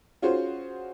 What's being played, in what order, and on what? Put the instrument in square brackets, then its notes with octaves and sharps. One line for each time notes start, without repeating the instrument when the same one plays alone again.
[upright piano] C#4 F4 F#4 G#4 C5